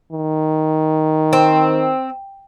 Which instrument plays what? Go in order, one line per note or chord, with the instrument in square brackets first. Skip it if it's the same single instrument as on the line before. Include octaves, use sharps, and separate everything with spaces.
[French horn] D#3
[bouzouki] C4